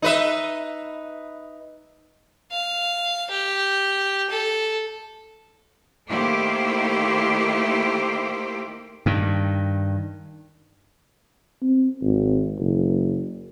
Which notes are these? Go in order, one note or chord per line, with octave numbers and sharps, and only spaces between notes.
D#4 B4 E5
F5
G4
A4
D#3 A3 A#3 E4 G4 C5
G2 D#3
C4
G#1
F#1